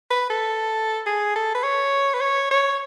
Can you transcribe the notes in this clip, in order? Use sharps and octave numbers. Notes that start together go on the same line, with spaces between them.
B4
A4
G#4
A4
B4
C#5
B4
C#5
C#5